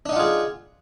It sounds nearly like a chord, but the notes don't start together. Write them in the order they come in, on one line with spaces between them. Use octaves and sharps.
D4 D#4 F#5 F4 G#4